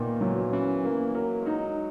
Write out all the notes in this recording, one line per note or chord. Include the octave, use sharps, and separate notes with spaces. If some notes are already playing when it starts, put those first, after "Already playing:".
Already playing: A#2 D#3 A#3 B3
E3 F#3
E3 C#4
F#3 A#3
F#3 A#4
G#3
F#3 D#4